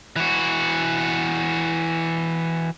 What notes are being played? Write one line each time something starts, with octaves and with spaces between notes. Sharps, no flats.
E3 F#4